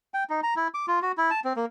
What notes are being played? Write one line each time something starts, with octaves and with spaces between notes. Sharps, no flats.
G5
D#4
A#5
E4
D6
F4
F#4
E4
A5
C4
A#3